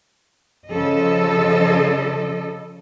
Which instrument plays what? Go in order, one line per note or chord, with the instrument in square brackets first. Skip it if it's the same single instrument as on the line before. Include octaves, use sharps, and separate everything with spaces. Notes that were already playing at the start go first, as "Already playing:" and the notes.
[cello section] C#3 F3 A4 D#5